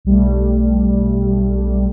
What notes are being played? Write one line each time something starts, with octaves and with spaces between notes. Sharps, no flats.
B1 G3 A3